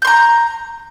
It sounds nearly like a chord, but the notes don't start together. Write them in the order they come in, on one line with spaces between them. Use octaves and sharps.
G6 C6 A#5